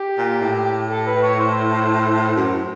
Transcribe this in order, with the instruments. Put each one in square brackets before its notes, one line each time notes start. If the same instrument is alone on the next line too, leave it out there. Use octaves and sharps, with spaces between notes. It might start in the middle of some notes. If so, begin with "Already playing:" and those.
Already playing: [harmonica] G4
[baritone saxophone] A#2
A2
[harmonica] A4
B4
C#5
C5
[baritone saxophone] F#2